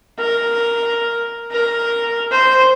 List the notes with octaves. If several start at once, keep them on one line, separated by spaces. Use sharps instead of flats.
A#4
A#4
C5